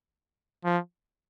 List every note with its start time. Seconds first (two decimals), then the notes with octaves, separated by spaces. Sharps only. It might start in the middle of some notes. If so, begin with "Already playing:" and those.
0.65 F3